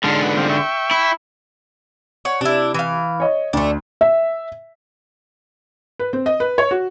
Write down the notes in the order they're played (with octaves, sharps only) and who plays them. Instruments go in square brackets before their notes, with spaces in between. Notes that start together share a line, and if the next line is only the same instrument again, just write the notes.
[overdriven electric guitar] G#2 D3 [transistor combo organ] A5 C6 F6
[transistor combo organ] B4
G3 C4 F4
E5 G5 C#6
[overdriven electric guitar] E4
[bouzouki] C#5 F#5
[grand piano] C3 [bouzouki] D4 E4
[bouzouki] E3 F5
[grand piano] C#5 D#5
[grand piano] D2 [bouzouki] A3 D4
[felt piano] E5
B4
C4
D#5
B4
C#5
F#4